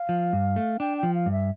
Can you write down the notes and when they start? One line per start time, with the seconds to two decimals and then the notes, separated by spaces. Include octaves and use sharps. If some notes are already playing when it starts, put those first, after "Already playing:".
Already playing: F5
0.09 F3
0.33 G2
0.56 A3
0.80 D4 G5
0.98 G5
1.03 F3
1.14 F5
1.26 G2
1.32 E5